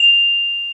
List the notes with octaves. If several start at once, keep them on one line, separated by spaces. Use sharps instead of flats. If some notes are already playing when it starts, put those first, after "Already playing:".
Already playing: F7